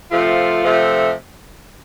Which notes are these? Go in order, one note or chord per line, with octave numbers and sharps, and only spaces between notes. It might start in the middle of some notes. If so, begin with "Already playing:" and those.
C3 F3 A3 F4
C3 F3 A3